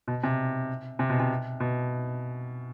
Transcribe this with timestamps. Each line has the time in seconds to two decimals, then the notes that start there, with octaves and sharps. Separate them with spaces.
0.08 B2
0.23 C3
0.99 C3
1.10 B2
1.20 C3
1.60 B2